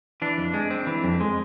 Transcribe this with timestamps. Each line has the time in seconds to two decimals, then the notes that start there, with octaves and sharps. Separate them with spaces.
0.22 E3 D4
0.38 F2
0.54 G#3
0.71 C4
0.87 E3
1.04 F2
1.20 G#3